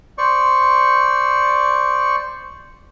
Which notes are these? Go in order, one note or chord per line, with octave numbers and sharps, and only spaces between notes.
C5 D5 C#6